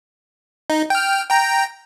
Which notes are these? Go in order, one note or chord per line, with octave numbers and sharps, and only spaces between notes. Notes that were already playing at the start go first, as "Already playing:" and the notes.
D#4
G5 F6
G5 A#5